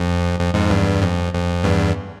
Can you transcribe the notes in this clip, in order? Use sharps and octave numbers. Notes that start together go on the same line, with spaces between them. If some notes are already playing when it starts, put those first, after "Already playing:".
Already playing: F2
F2
F2 G#2
E2 G2
F2
F2
E2 G2